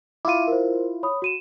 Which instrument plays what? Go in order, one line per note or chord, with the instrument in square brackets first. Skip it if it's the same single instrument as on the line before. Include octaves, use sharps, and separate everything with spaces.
[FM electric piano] E4 F4 [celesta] D6 D#7
[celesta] A#4 C5
C#5 B5 D#6
F#4 D#7 E7